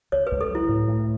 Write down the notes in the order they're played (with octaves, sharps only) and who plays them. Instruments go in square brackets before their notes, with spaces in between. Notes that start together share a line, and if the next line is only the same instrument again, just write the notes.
[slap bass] C#2 [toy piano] C#5
[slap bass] C#2 [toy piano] B4
[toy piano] A4
[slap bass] F#3 [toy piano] E4
[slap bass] A2
A2